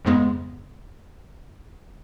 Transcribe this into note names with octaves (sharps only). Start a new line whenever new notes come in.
F2 G#2 C#3 G#3 B3